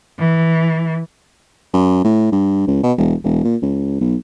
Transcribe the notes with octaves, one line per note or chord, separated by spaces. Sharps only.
E3
F#2
A2
G2
C#2
B2
E1
E1
A#2
C#2
B1